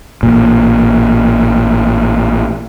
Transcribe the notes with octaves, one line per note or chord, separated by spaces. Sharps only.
A1 A#2